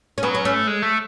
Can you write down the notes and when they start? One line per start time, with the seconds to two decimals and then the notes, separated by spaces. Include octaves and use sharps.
0.18 C#4
0.23 F#3 B3
0.35 C#4
0.45 A3 C#4
0.67 G#3
0.82 A3